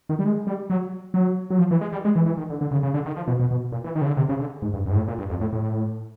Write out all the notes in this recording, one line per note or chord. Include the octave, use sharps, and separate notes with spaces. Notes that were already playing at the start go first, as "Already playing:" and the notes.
D#3
G3
G#3
G3
F#3
F#3
F#3
F3
E3
G#3
G3
G#3
E3
E3
D#3
D3
D3
C#3
C#3
D3
D#3
F3
B2
B2
B2
A#2
E3
D#3
C#3
D3
C3
C#3
D3
G#2
G2
F#2
G#2
A2
A#2
G2
F2
A2
A2